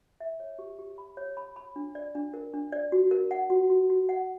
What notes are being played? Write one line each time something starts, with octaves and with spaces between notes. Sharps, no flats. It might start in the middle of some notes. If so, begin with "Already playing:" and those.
E5
C#5
G4
G4
B5
C#5
B5
B5
D4
D5
D4
A#4
D4
D5
F#4
A#4
F#5
F#4
F#4
F#4
F#5